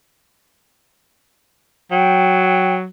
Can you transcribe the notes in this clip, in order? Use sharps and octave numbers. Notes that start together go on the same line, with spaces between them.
F#3 G5